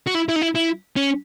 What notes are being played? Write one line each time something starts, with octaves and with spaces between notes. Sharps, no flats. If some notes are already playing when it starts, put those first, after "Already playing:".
F#4
E4
E4
D#4
E4
E4
C#4